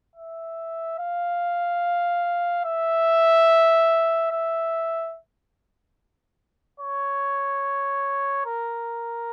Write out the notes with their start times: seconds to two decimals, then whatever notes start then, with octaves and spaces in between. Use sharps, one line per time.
0.15 E5
0.98 F5
2.65 E5
4.31 E5
6.80 C#5
8.46 A#4